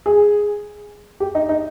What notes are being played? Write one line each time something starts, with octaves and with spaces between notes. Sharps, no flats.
G#4
G4
D#4
D#4